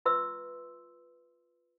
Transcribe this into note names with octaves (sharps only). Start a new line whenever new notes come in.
F4 B4 E5 C6 E6